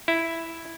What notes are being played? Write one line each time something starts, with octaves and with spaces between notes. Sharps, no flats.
E4